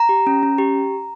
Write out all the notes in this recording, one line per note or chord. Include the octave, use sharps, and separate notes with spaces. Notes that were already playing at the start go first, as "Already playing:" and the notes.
Already playing: A#5
G4
C#4
C#4
G4